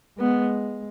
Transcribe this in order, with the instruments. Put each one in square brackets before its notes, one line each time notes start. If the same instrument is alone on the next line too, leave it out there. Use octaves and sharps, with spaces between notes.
[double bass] G#3 [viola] B3